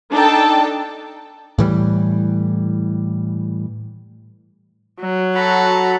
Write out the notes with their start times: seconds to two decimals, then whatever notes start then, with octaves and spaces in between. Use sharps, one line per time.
0.12 D4 D#4 A4 G5 A5
1.58 A2 E3 G3
5.00 F#3
5.35 F#4 A4 A#5 B5